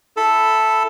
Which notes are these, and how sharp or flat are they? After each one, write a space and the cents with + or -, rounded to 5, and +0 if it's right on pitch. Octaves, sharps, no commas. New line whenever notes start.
E4 +0 A4 +0 B5 +0